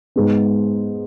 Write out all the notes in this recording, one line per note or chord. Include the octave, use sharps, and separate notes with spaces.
G#2 G#3 B3